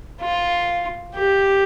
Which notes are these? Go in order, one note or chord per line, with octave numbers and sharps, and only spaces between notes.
F4
G4